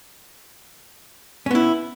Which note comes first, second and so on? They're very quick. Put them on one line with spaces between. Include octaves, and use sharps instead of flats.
C#4 B3 E4